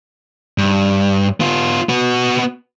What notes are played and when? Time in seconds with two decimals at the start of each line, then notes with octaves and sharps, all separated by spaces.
0.58 G2
1.40 B3 F4
1.89 B3 F#4